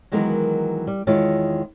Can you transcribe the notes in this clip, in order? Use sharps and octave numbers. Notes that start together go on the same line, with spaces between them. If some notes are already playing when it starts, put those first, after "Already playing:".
D#3 E3 F#3 G#3 B3 A#4
G3
E2 D#3 G#3 E4 F4 C#5